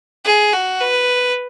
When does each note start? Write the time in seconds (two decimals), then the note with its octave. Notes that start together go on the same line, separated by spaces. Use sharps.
0.25 G#4
0.53 F#4
0.81 B4